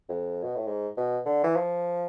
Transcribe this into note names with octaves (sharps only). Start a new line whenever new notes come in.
F2
B2
A2
G#2
B2
D3
E3
F3